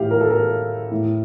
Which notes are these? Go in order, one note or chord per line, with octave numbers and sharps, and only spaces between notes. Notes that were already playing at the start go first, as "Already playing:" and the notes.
Already playing: A2 G4 F5
A#4
A4
A#4
A2